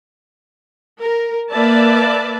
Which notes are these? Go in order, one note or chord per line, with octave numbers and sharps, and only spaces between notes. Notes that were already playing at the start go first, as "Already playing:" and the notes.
A#4
A#3 B4 D5 E5 A5